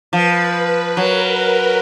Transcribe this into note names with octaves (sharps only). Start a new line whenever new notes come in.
F3 B4
F#3 A#4
A#4